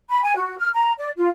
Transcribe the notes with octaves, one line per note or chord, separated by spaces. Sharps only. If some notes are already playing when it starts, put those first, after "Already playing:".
B5
G#5
F#4
F6
A#5
D5
F4